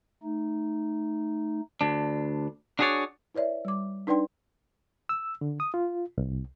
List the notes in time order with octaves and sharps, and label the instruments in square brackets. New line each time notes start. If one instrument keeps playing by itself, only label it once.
[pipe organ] A3 D#4
[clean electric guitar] D2 D4
D4 F#4 G#4 B4 C#5 D5
[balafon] E4 B4 C#5 D5 E5
G3 D6
D4 D#4 B4 D5 G5 C6
[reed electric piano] E6
D3
D#6
F4
C2